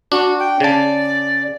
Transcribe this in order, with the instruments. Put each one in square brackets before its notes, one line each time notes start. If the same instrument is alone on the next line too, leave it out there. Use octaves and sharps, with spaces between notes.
[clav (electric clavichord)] D4 [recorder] F#4
[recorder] G5
[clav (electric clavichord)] C#3 A5 [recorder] D5